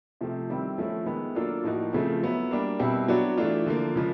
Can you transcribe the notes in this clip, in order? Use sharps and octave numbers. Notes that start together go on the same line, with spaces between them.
C3 F3 A3 C4
D#3 G3 C4 E4
F3 A3 C#4 E4
D#3 G#3 B3 E4
F#3 A#3 D4 F4 A4
A2 F3 A#3 D#4 F#4
C#3 F3 A3 C4
F#3 B3 E4
G3 A#3 D4
B2 G3 C4 E4
F#3 B3 D4 F#4
E3 A3 D4 F4
D3 F3 A#3
C#3 F3 G#3